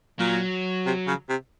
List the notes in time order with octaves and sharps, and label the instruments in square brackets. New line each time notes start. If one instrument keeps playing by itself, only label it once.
[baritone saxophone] A#2 [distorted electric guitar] F#3
[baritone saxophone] C3
C#3
C3